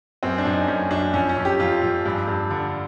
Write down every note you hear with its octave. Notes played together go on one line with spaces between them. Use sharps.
F#2 C4
D4
F#2
D#4
F#2 C#4
F#2 D4
F2 C#4
C#4
F2
G4
F2 F4
F2
G2
G2
D3